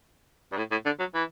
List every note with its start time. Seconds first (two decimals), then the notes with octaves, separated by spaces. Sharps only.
0.52 G2
0.58 A2
0.71 A2
0.86 D3
1.00 F#3
1.15 E3